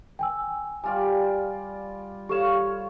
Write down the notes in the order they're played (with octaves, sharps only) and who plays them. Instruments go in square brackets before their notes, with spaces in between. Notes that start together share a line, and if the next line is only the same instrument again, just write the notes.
[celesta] G5 G#5 E6
[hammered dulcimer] G3 F4 D5 [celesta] G#5
[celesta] G4 A4 E7 [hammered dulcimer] C#5 F5 C#6